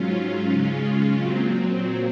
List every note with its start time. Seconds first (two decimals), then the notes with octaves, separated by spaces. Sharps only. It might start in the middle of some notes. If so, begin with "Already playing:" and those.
Already playing: G#2 F#3 C#4 F4
0.52 C#3 G#3 C#4 F4
1.18 A#2 F#3 C4